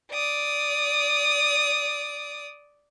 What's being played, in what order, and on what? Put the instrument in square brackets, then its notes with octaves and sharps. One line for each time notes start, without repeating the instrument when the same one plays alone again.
[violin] D5 D#6